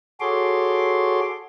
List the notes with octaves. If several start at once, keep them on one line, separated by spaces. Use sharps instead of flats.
F#4 G#4 A4 C#5 C6 D6